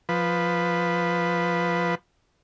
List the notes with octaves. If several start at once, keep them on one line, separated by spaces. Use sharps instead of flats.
F3 B4